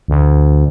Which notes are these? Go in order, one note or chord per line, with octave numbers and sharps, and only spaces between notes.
D2